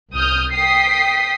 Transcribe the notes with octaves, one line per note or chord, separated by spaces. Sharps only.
C2 D#6 F6 G6
G5 D#6 B6 C7